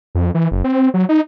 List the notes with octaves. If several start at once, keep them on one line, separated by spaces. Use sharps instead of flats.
F2
E3
F#1
C4
F#3
D#4